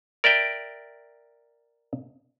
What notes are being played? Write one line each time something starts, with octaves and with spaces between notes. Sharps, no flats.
A#4 D5 E5 G5